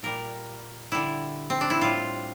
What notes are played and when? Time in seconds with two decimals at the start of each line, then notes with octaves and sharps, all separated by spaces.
0.03 A#2 G3 A#4
0.92 D3 G3 E4
1.50 C4
1.61 D4
1.70 E4
1.81 A2 G3 F4